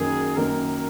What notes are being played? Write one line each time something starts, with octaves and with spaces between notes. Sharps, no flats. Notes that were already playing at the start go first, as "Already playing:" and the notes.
Already playing: F#2 D#3 A#3 G#4
F#2 D#3 A#3 A#4